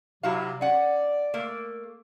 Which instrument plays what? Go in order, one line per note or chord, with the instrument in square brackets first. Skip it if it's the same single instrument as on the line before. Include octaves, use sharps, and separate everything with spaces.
[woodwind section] C3 F#3 [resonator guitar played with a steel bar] E4 F#4 F5
[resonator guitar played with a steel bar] C#4 F#5 [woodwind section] D5
[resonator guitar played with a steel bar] A3 A#3